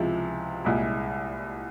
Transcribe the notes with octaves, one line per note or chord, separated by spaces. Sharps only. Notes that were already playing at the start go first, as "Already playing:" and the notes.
Already playing: C#2 C3 F3 G#3 E4
C2 A#2 G#3 E4